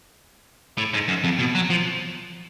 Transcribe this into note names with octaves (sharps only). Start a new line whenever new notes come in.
A2
G#2
F#2
F2
B2
F#3
F3